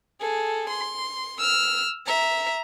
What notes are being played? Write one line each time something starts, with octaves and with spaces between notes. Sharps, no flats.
G#4 A4
C6
E6 F6
E5 A#5